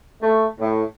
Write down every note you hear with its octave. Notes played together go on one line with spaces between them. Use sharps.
A3
A2